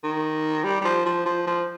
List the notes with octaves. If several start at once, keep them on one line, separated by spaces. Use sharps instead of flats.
D#3
G3
G3
F3
F3
F3
F3